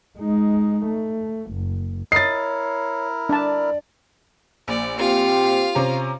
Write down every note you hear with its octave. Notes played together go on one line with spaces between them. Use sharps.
G#3 D#4
A3
F#1
E4 A#4 C#5 D#5 A6 C7
D4 D5 A5
A#1 D5
C4 F4 G4 F5
C3 C#4 A#5